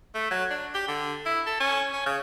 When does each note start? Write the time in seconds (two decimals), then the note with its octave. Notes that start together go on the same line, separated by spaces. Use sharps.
0.15 A3
0.31 F#3
0.50 D4
0.75 G4
0.88 D3
1.25 E4
1.46 A4
1.60 C#4
1.93 C#4
2.06 C#3